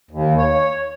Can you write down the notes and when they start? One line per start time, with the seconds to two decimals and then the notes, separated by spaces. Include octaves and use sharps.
0.11 D#2
0.37 C#5